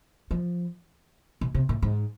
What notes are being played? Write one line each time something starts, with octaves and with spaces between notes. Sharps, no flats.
F3
B2
C3
A2
G#2